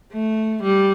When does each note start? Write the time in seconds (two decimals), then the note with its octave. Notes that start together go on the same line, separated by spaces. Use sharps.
0.12 A3
0.63 G3